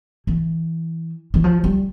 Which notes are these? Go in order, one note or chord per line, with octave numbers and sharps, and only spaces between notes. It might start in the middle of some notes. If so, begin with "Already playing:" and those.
E3
E3
F3
G3